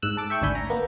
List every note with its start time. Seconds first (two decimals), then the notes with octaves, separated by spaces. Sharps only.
0.02 G#2 E6 F#6
0.17 A4 D6
0.30 E5 G5 C#6
0.42 G#1 D2 D4 G#5 B5 G6
0.55 A#5
0.70 A#3 B3